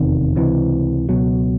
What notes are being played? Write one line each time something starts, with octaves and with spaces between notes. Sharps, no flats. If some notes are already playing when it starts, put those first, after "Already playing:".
Already playing: F1 E2 C3 D#3
C#2 C3 E3
C#2 B2 F#3